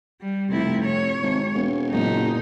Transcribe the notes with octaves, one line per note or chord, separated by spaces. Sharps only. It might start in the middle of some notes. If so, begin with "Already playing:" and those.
G3
F1 C3 E4
C#5
G#1
E1
F#1 A#2 D#4